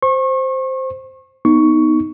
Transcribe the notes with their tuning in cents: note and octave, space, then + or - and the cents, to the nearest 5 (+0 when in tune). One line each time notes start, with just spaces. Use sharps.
C5 +0 C#6 -35
B3 +0 D#4 +0 C#6 +10